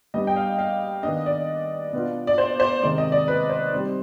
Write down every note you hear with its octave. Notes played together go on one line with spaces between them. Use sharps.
G3 B3 D4 D#5
G5
F5
F5
D#3 B3 D4 D#5
D5
B2 B3 D4 F4
D5
C5
C5
C3 D#3 G#3 D5
D#5
D5
B4
C5
G3 C4 D#4